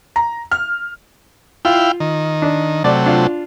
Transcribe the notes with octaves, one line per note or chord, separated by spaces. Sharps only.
A#5
F6
E4 F4 F5 G5
D#3
D4
C3 F#3 A3 D5
D4 F4